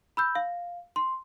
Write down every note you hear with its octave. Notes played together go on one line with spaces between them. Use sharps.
B5 E6 G6
F5
C6